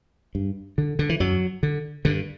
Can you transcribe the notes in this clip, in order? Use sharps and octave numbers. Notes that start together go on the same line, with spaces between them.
G2
D3
D3
E3
F#2 F#3
D3
G2 D3